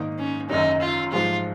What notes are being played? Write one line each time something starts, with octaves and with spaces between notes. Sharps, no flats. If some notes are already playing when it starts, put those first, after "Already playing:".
Already playing: G#2 D#3 A#3 D#4
C#4
F#1 F#2 D#3 F#3 D#4
F4
G#2 F3 G#3 F4